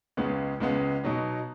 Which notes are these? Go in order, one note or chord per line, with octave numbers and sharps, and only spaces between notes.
C#2 C#3 G#3 B3
C#2 C#3 G#3 B3
B2 F#3 D#4